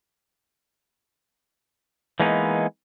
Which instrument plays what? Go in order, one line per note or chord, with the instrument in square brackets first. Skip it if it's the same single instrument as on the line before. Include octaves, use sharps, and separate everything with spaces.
[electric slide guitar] E3 G#3 A#3 B3 D#4